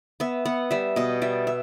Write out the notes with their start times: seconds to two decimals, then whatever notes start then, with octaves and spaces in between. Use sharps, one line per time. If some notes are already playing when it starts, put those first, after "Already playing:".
0.20 B3 E5
0.45 B3 F#5
0.71 G3 E5
0.96 B2 D#5
1.22 G3 E5
1.47 E5